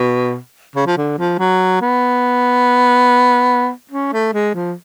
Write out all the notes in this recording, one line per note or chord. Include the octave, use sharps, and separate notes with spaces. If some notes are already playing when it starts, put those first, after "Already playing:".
Already playing: B2
C#3
F3
D3
F3
F#3
B3
C#4
A3
G#3
F3